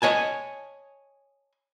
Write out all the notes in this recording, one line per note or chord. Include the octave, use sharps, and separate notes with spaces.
C#5 D#5 G#5 A5